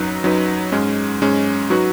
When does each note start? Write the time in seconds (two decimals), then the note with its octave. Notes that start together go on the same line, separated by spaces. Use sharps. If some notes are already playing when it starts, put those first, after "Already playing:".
Already playing: F#2 F#3 D#4 B4
0.24 F#2 F#3 D#4 B4
0.72 G#2 G#3 C#4
1.22 G#2 G#3 C#4
1.70 F#3 D#4 F#4 B4